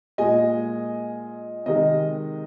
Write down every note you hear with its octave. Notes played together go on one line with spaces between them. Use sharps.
A#2 G#3 D#5 G#5
C3 D#3 G#3 D#5